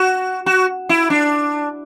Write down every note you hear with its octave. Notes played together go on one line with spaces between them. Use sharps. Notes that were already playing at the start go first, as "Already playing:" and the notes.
Already playing: F#4
F#4
E4
D4